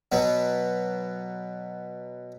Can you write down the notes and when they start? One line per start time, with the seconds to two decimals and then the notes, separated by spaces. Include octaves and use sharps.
0.12 B2 F#3 B3